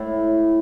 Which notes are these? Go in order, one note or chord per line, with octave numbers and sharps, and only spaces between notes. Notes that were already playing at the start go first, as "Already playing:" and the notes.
Already playing: A2